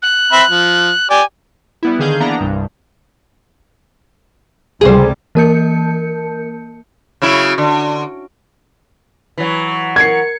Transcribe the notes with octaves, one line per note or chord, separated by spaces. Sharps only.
F#6
C4 E5 B5
F3
G4 D5 G#5
G3 B3 E4
D3 D#3 G#4 F5 G6
E3 A#3 B3 D4 A#5
C2 G2
C#2 C3 G3 G#4 C5
E3 A#3 A#4 A5 G6 C#7
C#3 F#3 E4
D3
E3 F#3
A#4 G#6 C7 C#7